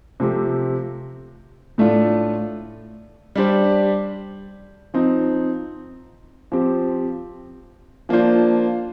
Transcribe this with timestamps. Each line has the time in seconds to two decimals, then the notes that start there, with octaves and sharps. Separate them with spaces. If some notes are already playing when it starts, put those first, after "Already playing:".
0.20 C3 F3 A3 C4 G4
1.78 A2 A3 D4 F4
3.36 G3 D4 G4 C5
4.94 F3 C4 D#4
6.52 F3 C4 G4
8.09 F3 A#3 D4 F4 C5